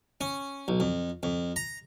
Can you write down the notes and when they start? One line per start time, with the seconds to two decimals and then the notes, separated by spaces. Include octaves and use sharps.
0.21 C#4
0.68 B1
0.80 F2
1.23 F2
1.56 A#5